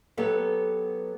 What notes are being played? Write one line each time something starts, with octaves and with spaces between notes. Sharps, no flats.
F#3 B3 G4 A4 B4